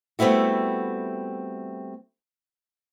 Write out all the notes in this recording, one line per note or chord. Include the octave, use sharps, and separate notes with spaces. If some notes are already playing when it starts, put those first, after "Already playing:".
G3 A3 B3 C4 E4 F#4